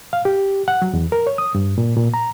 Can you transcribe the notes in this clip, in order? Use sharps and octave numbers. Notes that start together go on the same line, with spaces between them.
F5
G4
F#5
F#3
E2
A#4
C#5
D#6
G2
A#2
A#2
A#5